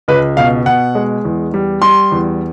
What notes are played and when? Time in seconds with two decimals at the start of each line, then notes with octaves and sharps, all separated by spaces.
0.08 C#2 B4
0.37 B2 F5
0.66 B2 F#5
0.95 G#3
1.25 E2
1.54 G3
1.82 G3 C6
2.12 E2